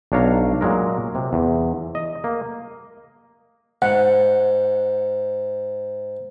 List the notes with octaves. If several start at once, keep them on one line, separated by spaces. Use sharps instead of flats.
B1 D4 C#5 F5 A#5
A#2 F#3 G#3 A#4
C3
E2
D#5
A#3
G#2 F#5